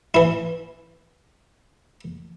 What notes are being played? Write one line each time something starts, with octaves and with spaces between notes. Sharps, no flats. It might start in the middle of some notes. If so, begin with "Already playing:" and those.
E3 E4